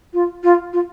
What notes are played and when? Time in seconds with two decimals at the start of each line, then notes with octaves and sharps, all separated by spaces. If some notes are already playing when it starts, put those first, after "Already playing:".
0.14 F4
0.43 F4
0.73 F4